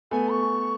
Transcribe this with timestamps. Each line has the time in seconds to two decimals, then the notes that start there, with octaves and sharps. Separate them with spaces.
0.11 A3 B3 G#5
0.31 C#6